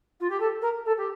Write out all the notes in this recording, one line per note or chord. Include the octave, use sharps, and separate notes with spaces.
F4
G4
A4
A#4
A4
G4